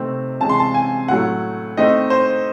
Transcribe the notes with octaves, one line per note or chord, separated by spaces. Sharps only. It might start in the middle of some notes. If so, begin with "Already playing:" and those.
Already playing: C3 D#3 A3 C4
C3 E3 G#3 C#4 A5
C6
A5
G#5
A2 F#3 A3 F#5
D#3 A3 C4 D#4 D#5
C5